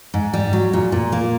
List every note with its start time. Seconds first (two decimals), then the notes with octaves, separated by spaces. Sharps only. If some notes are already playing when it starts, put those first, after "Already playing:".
0.14 G#2
0.33 G3
0.53 F#3
0.73 A#2
0.92 A#2
1.12 A#3